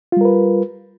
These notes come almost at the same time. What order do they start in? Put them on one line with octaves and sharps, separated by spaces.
F4 G3 A#4 B4